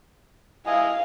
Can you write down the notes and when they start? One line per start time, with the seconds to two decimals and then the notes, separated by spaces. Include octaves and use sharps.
0.67 E4 D#5 F5 G#5